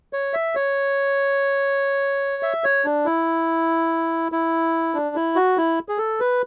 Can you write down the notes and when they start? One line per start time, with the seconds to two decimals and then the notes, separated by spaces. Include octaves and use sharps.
0.13 C#5
0.33 E5
0.55 C#5
2.43 E5
2.64 C#5
2.85 D4
3.06 E4
4.32 E4
4.94 D4
5.16 E4
5.36 F#4
5.57 E4
5.89 G#4
5.98 A4
6.20 B4